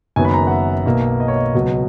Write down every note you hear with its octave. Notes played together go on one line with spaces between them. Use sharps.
F#1 F#2 D#3 F#3 B3 G#5
B5
A#5
F#5
E5
B1 B2 A#3
D#5
C#5
D#5
C#2 B2 F#3